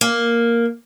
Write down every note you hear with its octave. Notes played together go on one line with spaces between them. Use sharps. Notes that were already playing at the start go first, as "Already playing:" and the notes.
A#3